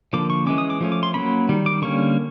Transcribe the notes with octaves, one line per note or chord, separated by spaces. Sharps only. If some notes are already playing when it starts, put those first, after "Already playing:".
D3 F3 A#3 D6
C#6
E3 G#3 C#4 D6
D#6
D6
F3 A3 C#4
D6
C6
F#3 A#3 C#4 B5
D#3 G3
D6
D3 G3 A#3 C#4 C#6